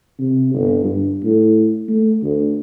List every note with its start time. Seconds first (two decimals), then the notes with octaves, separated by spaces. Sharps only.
0.19 C3
0.54 G1
0.84 G2
1.24 A2
1.89 A3
2.23 D2